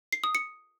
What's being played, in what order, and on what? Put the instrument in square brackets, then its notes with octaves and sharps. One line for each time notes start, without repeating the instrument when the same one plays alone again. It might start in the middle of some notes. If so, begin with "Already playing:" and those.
[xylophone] C7
D#6
C#7